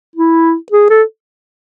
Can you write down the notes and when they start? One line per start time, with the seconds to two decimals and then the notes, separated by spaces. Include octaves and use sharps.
0.16 E4
0.72 G#4
0.90 A4